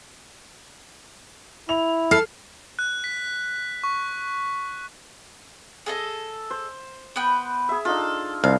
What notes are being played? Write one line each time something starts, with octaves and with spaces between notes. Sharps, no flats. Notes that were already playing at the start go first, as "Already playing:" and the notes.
E4 F7
A4 F6 C7
F#6
B6
C#6
G#4 A4 D#5
C5
B3 B4 G5
G#4 E5
D4 D#4 F4 A4
C2 F5